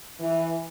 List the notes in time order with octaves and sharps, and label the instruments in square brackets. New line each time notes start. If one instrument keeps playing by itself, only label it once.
[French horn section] E3